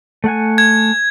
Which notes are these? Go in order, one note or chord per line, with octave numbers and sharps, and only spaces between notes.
A3 F#5 G#5
G#6